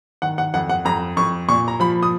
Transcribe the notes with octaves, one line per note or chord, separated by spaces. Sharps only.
D#3 F#5
F#5
F2 F#5
F#5
F2 A#5
F2 C#6
A#2 C#6
A#5
F3 B5
D#6